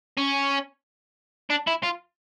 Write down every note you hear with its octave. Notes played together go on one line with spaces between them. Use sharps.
C#4
D4
E4
F4